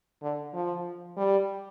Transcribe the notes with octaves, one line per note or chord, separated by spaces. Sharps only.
D3
F3
G3